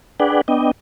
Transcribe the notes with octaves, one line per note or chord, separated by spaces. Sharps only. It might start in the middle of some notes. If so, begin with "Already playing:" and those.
D4 G#4 B4 D5 F#5 G5
B3 D4 D#5 G5